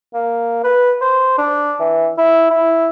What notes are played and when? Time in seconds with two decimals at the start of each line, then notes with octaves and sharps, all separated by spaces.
0.14 A#3
0.64 B4
1.01 C5
1.38 D4
1.80 E3
2.18 E4
2.50 E4